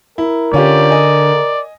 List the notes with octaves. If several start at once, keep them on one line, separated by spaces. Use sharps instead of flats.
E4 A#4
D3 C#4 F4 G4 D5
D#5 G#5